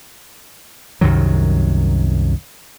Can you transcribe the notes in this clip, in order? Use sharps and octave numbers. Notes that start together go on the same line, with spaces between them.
C2 F#2 D#3 F#3